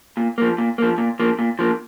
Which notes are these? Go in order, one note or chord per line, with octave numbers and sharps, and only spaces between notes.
A#2
F3 A#3
A#2
F3 A#3
A#2
F3 A#3
A#2
F3 A#3